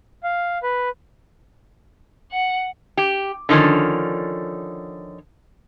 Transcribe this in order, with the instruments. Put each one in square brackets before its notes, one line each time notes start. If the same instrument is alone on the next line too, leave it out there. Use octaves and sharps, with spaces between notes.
[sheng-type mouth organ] F5
B4
[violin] F#5
[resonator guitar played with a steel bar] G4
D3 D#3 F3 C#4